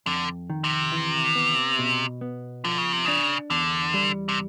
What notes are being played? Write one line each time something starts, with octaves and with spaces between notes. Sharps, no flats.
F2 D3
D#3
C3
E3
B3
B2
B3
D3 F3
C#3
C3
C#3 D4
E2 D3
G3
C3